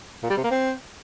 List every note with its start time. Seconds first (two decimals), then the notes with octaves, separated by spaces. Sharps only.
0.23 A#2
0.30 G3
0.37 C3
0.44 A#3
0.51 C4